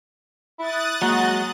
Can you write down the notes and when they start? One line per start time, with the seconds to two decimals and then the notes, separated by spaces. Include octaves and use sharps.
0.59 E4 D#6 F#6 A6
1.02 F#3 G#3 A#3 F#4